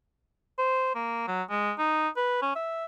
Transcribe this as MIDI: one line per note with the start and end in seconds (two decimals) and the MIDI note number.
0.59 0.90 72
0.95 1.27 58
1.28 1.42 54
1.50 1.73 56
1.78 2.08 63
2.16 2.38 71
2.42 2.52 61
2.55 2.86 76